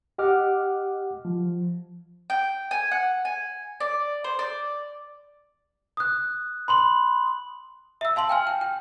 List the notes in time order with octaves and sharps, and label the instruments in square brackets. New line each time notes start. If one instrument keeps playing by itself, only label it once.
[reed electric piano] G4 D#5 F#5 D6 F6
F3
[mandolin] G5
G#5
F#5
G#5
D5
C5
D5
[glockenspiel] D#6 F#6
B5 C6 F#7
[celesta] E5 E6
F5 A5 C6 F#7
G5 G#5 F6
G5
G5